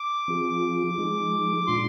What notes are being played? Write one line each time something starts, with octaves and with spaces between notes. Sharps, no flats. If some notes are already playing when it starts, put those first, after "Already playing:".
Already playing: D6
F3 C4 F4 G#4
F3 G#3 D#4 G#4
A#2 G#3 D4 F4 C6